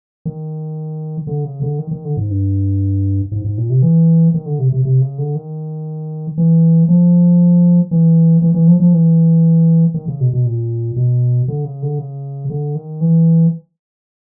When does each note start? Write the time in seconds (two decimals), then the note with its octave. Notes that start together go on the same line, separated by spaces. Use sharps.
0.25 D#3
1.27 D3
1.44 C#3
1.62 D3
1.79 D#3
1.91 D#3
2.05 D3
2.17 G#2
2.30 G2
3.32 G#2
3.45 G#2
3.58 A#2
3.70 C3
3.82 E3
4.34 D#3
4.46 D3
4.59 C3
4.72 C3
4.85 C3
5.01 C#3
5.18 D3
5.35 D#3
6.38 E3
6.89 F3
7.91 E3
8.42 E3
8.54 E3
8.67 F3
8.80 F3
8.93 E3
9.94 D#3
10.08 C#3
10.20 B2
10.33 B2
10.46 A#2
10.96 B2
11.48 D3
11.65 C#3
11.82 D3
11.99 C#3
12.50 D3
12.75 D#3
13.01 E3